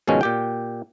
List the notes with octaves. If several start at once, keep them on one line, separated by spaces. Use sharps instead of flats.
G#2 B2 D#3 F3 G#3 C#4
A#2 G4 G5